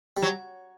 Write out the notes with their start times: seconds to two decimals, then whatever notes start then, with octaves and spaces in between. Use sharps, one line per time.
0.17 G3
0.22 F#3